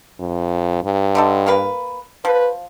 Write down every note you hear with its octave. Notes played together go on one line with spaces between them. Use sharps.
F2
G2
D3 D#4 A4
A#3 A#4 B4
F3 B4